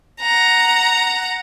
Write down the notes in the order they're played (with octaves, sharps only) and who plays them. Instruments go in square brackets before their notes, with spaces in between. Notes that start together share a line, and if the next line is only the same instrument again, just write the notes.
[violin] F#5 A#5